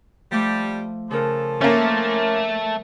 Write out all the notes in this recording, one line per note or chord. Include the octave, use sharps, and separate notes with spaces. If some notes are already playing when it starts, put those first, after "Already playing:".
F3 G3 A3 D6
C#3 F3 C#4 A4 A#4
A3 A#3 C#4 C#5 D5